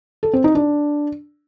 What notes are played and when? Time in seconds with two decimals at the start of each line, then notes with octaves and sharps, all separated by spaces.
0.23 A4
0.33 C4
0.44 D#4
0.55 D4